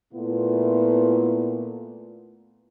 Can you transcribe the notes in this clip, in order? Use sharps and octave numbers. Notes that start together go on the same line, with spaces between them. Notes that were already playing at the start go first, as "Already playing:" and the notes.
A#2 A3 B3 E4 F4